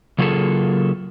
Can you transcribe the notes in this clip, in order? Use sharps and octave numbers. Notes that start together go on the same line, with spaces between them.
C#3 F#3 A#3 F4 G#4 A4